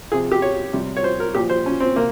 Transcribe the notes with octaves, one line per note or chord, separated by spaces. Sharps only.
C3 F3 G#4
G4
C#5
C3 G3
C#5
C5
A#4
A#2 F3 G4
C5
C#4
C4
C3 A#3